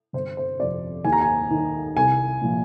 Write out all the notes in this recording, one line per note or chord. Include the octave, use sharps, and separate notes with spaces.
G1 C5
C5
F2 C3 D5
D#2 G#5
A#5
G#5
D#3
C2 G#5
A#2 F3